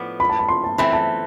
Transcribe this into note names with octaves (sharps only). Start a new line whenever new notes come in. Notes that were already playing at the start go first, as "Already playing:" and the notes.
Already playing: A2 F3 B3 D4
B5
A5
B5
C6
A5
E3 A3 C4 B5
A5